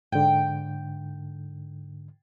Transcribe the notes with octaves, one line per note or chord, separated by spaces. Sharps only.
G#2 D3 G5